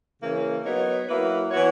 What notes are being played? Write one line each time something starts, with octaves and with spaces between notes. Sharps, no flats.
C#3 E3 A#3 C#4
F#3 B3 D#4 A#4 C#5
F#3 A#3 E4 B4
E3 B3 F#4 C#5